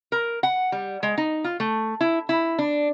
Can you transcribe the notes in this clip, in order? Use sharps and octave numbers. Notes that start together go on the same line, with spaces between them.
A#4
F#5
G3
G#3
D#4
F4
A3
E4
E4
D4